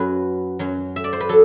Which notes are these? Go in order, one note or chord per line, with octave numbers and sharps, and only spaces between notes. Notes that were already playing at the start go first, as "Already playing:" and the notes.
Already playing: F#2 F#3 B4
F#2 F#3
E5
D5
C5
B4
F#3 A4